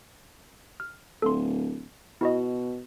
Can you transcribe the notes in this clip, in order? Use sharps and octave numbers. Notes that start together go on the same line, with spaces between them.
F6
D1 A4 C6
B2 E4 F#4 D#5